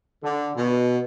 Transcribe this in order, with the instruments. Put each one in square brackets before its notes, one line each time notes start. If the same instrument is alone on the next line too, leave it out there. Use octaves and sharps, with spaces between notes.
[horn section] D3
B2